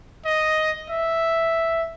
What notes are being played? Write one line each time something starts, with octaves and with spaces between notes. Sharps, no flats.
D#5
E5